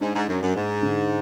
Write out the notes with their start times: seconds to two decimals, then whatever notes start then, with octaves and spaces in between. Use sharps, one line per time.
0.01 G#2 D4
0.15 G#2
0.28 F#2 D4
0.42 F#2
0.55 G#2 G#3
0.83 D3